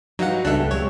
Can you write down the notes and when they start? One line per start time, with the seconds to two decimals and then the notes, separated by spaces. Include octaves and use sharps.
0.19 E3 F#3 G3 D#4 F#4 F5 F#5
0.45 C#2 C#3 B3 D4 G4 A4 E5 F#6
0.71 C3 F#3 G#3 C#5